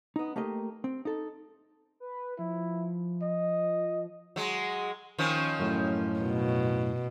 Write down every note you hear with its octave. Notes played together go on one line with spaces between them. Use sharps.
B3 D#4
A3 A#3 G4 D#5
C4
D#4 A4
B4
F3 E4
D#5
F#3 G#3
D#3 F3 C#4
F#2 A2
B2